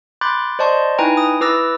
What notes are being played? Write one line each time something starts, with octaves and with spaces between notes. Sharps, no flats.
B5 C6 D6 F#6 G6 A6
C5 D5 D#5 A5 C6 C#6
D#4 E4 B4 G5 G#5 A#5
D#6
E4 B4 D6 E6 A6 A#6